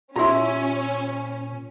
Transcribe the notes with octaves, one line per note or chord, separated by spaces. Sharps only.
A#2 C#4 E4 F4 G4 A#5 C6